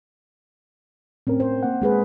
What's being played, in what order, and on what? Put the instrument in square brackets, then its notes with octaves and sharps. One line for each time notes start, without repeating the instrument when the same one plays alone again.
[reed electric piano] A2 C#4 A#4 [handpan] C4
[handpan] C5
[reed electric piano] A#3 F#5
[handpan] G#3 G#4 B4